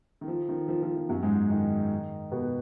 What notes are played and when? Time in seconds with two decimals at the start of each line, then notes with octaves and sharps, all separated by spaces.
0.21 D#3
0.28 F3
0.49 D#3
0.68 F3
0.82 F3
0.96 F3
1.09 F#2 F#3
1.23 G#2 G#3
1.50 D#3 D#4
2.32 B2 B3